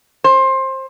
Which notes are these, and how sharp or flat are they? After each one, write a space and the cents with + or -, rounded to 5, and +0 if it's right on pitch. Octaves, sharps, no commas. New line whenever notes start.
C5 +20